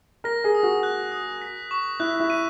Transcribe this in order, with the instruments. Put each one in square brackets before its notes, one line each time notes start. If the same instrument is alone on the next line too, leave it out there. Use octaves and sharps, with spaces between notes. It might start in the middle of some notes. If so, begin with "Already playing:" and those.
[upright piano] A#4 [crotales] A#6
[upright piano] G#4
[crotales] D#6
[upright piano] F#4
[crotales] F#6
D#6
B6
C#6
[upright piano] E4 [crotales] F#6
[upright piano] E4
[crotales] D#7